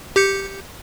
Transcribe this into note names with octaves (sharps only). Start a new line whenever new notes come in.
G4 G6 C#7